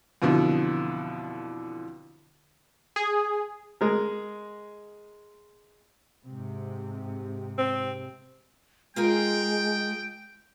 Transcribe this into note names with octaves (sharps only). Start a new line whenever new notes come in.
F2 B2 D3 E3
G#4
G#3 A#4
G#2 C3
C4
G#3 F4 G#4 A#4 G5